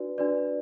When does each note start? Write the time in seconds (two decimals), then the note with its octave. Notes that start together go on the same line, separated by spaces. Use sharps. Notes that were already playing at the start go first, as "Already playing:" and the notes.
Already playing: D4 F#4 B4 D5
0.18 D4 F#4 B4 D5